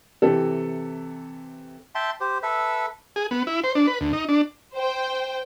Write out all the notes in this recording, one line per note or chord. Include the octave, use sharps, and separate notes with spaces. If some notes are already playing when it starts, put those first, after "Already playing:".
C3 E3 G4 A4
E5 G5 A5 C6
G4 C5
A4 B4 E5
G#4
B3
E4
C5
D4
B4
D2
D#4
D4
C5 G5